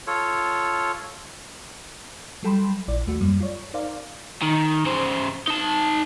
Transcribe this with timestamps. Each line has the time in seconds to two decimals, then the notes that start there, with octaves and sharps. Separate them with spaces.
0.07 F4 A4 C#5
2.43 F#3 G3 A4 G5 B5 C6
2.88 A#1 E4 D5
3.06 D#2 A3 F#4
3.20 F#2 G3 A#3
3.40 F4 C#5 D5
3.74 D#4 A#4 C5 D5 F5
4.42 D#3
4.86 C#3 C5
5.48 D#4 A5